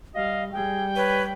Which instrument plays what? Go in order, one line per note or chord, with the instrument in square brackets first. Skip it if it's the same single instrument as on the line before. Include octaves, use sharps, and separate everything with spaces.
[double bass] G3 [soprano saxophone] D#5 [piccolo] F5
[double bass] G3 [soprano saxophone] G#4 [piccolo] G5
[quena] B4 [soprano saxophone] C#5